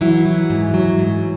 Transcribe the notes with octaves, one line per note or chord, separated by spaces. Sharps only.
E3 F#3 E4
F#3
G#2
F#3
G#2